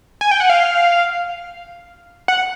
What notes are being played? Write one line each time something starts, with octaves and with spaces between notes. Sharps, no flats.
G#5
G5
F#5
F5
F#5